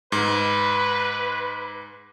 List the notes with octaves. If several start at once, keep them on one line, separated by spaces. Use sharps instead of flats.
G#2 B4